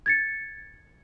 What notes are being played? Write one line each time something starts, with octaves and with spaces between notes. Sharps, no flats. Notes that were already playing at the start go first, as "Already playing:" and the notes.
G#6 A6 C#7